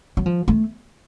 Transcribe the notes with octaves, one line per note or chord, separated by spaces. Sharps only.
F#3
F3
A3